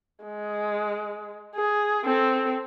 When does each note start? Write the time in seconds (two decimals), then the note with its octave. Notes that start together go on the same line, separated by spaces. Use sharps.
0.24 G#3
1.56 G#4
2.04 C4 A4